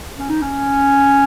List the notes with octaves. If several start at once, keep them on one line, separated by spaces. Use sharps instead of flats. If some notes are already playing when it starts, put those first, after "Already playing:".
C#4
D#4
C#4